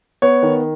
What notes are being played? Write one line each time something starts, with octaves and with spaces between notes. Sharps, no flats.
B3 C#5
D#3